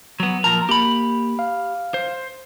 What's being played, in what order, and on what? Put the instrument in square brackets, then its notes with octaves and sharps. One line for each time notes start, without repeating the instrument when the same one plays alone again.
[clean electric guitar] F#3 B3
[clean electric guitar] A#2 F3 A#4 [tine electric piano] A5 A#6
[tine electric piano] A#3 [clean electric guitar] G4 B5
[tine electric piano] F5
[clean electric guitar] C5